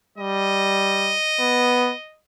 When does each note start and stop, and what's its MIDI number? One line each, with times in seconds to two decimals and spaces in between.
0.18 1.16 55
0.18 2.18 75
1.40 1.92 59